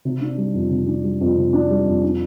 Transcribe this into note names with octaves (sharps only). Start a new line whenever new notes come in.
C3
D4
G3
F2
C3
D4
G3
F2
C3
D4
G3
F2
D4